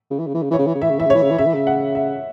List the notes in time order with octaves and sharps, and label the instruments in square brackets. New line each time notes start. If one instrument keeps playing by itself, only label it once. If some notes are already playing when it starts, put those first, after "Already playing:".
[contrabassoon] C#3
E3
C#3
E3
C#3
[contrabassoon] E3 [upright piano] C#5
[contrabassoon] C#3
E3
C#3
[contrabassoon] E3 [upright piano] E5
[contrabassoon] C#3
[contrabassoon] E3 [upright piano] E5
[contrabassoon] C#3
[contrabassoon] E3 [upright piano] C#5
[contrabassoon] C#3
E3
[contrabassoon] C#3 [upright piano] E5
[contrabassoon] E3
C#3
[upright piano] F#5
E5